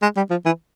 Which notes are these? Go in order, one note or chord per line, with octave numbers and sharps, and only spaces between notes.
G#3
G3
F3
E3